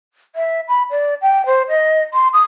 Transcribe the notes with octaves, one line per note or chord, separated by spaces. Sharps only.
E5
B5
D5
G5
C5
D#5
C6
D#6